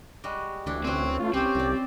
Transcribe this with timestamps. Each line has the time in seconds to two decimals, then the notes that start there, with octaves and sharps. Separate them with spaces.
0.24 G3 G#3 F#4
0.66 D2 E3 D4 E4
0.84 C4 C#4 B4 C5
1.20 A3 F4
1.34 C2 C4 C#4 F4 G4
1.55 C2 F3 D5